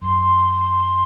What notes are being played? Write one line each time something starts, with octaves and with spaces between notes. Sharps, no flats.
F#2 C6